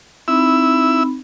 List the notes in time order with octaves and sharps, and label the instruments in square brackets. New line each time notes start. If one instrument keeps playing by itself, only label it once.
[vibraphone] C4 D#4 B5 [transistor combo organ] E4 E6